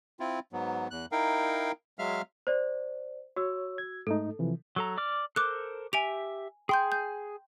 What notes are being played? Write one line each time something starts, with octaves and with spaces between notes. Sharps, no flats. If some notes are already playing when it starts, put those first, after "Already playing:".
C4 E4 F4
G#2 F#3 B3
E2 F#6
D#4 E4 A#4 F5 G5
F#3 G#3 E5 F5 F6
C5 D5
F#4 C#5 E6
G#6
G#2 A3 D#4 A4
C3 E3 F3
F#3 A4 A#5
D5 D6 F6
A4 A#4 C5 D6 F#6
G4 E5 G#5 D7 F7
G#4 G5 G#5 C6 G6
G6